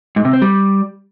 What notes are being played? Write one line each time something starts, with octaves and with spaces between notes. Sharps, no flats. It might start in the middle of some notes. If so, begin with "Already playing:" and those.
G#2
C3
C4
G3